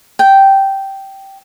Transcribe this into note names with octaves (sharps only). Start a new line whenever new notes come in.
G5